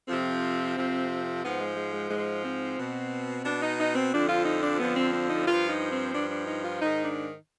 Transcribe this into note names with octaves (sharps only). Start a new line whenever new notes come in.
F2 C3 F3 C4
F2 C3 F3
G#2 F3 B3
G#3
G#3
G#3
G#2 F3 G#3
C4
B2
B2 D4
D#4
D#4
C4
F2 D3 F3 D4
F4
D#4
D4
F2 D3 F3 B3
C4
C4
D#4
G2 F3 F4
D#4
C4
G2 F3 D4
D4
D#4
F4
G#2 D#3 D#4
D4